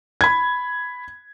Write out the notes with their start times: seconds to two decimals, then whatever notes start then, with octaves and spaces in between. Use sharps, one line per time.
0.21 B5 G#6